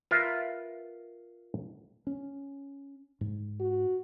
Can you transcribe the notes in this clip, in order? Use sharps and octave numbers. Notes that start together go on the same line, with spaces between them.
F4 A#4 B4 E5
C#4
G#2
F#4